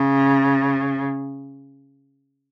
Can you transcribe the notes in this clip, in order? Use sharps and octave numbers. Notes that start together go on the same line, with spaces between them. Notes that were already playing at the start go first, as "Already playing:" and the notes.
Already playing: C#3